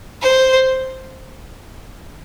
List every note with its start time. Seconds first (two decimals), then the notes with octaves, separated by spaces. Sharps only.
0.22 C5